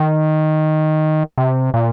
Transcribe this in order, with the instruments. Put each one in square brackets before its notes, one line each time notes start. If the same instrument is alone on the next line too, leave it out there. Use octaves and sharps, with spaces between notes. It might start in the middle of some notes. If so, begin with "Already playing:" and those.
Already playing: [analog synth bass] D#3
C3
A#2